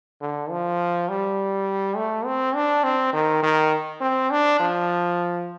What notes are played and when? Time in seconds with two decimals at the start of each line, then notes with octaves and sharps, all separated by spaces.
0.21 D3
0.50 F3
1.09 G3
1.96 A3
2.25 C4
2.55 D4
2.84 C4
3.13 D#3
3.43 D#3
4.01 C4
4.31 D4
4.60 F3